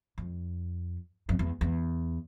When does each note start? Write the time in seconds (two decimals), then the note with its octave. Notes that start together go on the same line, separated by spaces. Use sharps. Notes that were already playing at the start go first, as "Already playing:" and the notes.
0.18 F2
1.29 F2
1.39 E2
1.61 E2